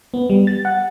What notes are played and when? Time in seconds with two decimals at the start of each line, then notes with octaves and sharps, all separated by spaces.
0.14 B3
0.30 G3
0.47 A6
0.65 F#5